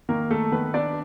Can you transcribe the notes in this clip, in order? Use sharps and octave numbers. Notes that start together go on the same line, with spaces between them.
D#3 A#3 A#4
A3 A4
D#3 B3 B4
D4 D5